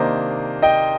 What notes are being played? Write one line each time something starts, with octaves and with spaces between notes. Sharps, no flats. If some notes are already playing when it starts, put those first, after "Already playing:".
Already playing: C3 D#3 A#3 D4 C5 D#5
D#5 G5